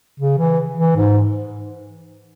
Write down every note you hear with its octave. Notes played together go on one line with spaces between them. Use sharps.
C#3
E3
E3
G#2